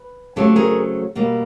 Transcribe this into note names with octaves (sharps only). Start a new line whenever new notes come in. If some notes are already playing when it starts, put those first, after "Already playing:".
Already playing: B4
C#3 F#3 A3 C4 G4 A4
G#4 A#4
B2 G3 A#3